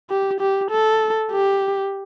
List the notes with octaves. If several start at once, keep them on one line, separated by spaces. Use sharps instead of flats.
G4
G4
A4
G4